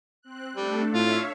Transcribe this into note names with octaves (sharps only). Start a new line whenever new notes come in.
C4 F#6
G3 A3 D4 A4
A2 F4 C#5 E5 F5